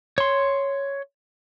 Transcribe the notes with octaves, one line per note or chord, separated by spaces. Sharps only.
C#5 C6